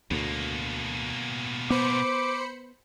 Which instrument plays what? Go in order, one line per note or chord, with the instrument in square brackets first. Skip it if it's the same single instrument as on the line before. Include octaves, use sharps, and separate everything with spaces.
[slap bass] D2 [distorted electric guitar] B2 A#3
[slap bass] B3 [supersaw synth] C5 B5 C#7 [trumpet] D6